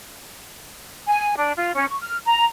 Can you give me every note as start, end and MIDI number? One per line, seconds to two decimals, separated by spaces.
1.07 1.35 80
1.37 1.52 62
1.56 1.72 65
1.75 1.88 61
1.88 1.99 85
2.02 2.17 89
2.25 2.44 82